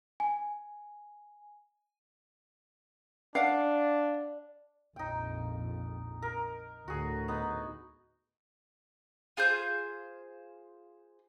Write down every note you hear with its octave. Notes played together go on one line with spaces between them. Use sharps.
G#5
D4 D5 F5 F#5
A#1 F2 D#4 G5
A#4
D2 A2 F#4 G#4
B3 D#4
F4 G#4 C5 G6